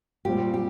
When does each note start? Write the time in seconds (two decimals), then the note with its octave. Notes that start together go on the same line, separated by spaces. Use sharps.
0.25 A#2 G3 C4 G4
0.54 G4